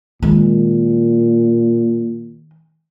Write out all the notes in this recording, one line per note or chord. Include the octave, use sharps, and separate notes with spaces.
A#2 D#3 G#3